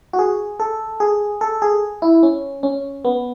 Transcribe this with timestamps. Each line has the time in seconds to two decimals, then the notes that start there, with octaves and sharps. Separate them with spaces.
0.13 F#4
0.19 G#4
0.60 A4
1.00 G#4
1.41 A4
1.62 G#4
2.02 E4
2.23 C#4
2.63 C#4
3.05 B3